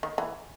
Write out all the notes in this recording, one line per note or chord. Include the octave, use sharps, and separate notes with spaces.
D#3
E3